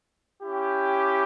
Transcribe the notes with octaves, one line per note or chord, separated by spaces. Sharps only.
C#4 E4 G4